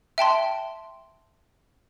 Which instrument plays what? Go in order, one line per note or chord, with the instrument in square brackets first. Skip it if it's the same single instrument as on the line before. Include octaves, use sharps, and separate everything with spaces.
[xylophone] E5 G5 A5 C6